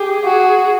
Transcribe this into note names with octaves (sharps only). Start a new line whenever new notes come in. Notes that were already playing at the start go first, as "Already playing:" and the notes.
Already playing: G4 G#4
F#4